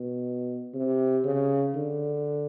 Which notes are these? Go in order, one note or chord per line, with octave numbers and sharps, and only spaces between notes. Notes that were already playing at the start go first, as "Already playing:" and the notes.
Already playing: B2
C3
C#3
D3